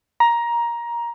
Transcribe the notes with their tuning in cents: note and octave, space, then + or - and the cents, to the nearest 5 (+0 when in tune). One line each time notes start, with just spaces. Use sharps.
A#5 +15